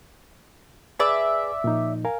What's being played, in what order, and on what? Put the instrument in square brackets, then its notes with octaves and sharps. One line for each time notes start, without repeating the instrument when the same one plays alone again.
[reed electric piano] G#4 B4 G#5 [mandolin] D5 E5
[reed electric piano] A#2 F3 D#4
A#4 F5 G#5